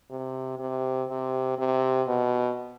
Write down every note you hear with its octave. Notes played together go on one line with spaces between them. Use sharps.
C3
C3
C3
C3
B2